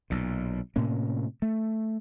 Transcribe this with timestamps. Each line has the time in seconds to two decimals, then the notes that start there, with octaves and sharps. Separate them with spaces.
0.10 B1 A#2
0.76 A2 C3 A#3 C#4
1.42 A3